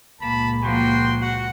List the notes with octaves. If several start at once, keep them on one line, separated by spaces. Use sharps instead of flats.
C#2 A#2 A#3 A5 B5
F3 A#3 F#4 G5 C6
F#4 F#5